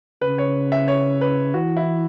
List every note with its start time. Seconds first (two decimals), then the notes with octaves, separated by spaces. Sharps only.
0.22 C#3 B4
0.38 C#5
0.72 E5
0.88 C#5
1.21 B4
1.54 E3 F#4
1.77 E4